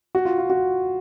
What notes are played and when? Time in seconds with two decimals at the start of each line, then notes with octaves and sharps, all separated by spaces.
0.15 F#4
0.25 F4
0.38 F4
0.50 F#4